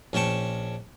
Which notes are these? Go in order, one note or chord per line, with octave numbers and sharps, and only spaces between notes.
A#1 C#4 G5 A5 C#6